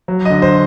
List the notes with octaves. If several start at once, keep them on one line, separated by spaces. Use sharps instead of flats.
F#3
D3 D#5
C5